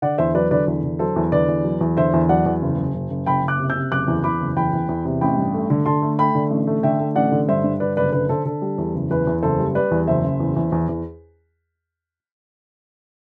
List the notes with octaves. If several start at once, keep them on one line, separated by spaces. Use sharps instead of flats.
D3 D5 F#5
E2 C5 E5
F#3 B4 D5
D3 B4 D5
E2
D3
F#3 A4 C5
E2
D3 B4 D5
E2
F#3
E2
D3 C5 E5
E2
F#3 D5 F#5
E2
F#1
F#1
F#1
F#1
F#1 G5 B5
F#1
D6 F#6
C3
E6 G6
C3
F#1 D6 F#6
E2
E2 B5 D6
F#1
E2 G5 B5
E2
E2
C3
A1 G5 B5
G2
A3
D3
D3 A5 C6
A3
A3 G5 B5
D3
A1
A3
D3 E5 G5
A3
A1 D5 F#5
D3
G2 C5 E5
G2
D3 B4 D5
F#1 B4 D5
D3 B4
D3 A4 C5
D3 A4
G3
E2
F#1
E2 B4
E2
F#1 A4 C5
G3
G3 B4 D5
E2
F#1 C5 E5
F#1
E2
E2
E2
E2